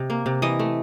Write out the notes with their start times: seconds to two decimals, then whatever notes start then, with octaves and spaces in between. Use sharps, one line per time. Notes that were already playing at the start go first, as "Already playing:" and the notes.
Already playing: C3 D#5
0.10 A#3
0.26 C3
0.42 E3 D#5
0.59 A3